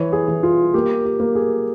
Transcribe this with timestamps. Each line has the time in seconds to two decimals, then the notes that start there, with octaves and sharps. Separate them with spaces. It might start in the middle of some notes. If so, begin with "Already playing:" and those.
Already playing: E3 C#5
0.13 G#4
0.28 E3
0.43 F4
0.74 A#3 G4
1.05 G4
1.20 A#3
1.35 G#4